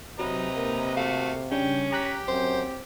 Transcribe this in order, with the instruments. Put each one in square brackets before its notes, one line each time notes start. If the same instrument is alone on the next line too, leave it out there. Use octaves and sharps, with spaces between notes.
[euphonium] C3 [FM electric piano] F#3 [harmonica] B4 D#5 A#5
[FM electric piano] A#3
[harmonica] A3 F#4 [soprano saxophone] F5
[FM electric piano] C#3 G3 D4 [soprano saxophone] C#4 [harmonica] G5
[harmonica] G4 [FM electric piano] A#5 F#6 B6
[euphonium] F#2 [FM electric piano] C4 [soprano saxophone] C5